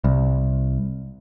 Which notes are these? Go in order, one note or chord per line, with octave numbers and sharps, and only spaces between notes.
C2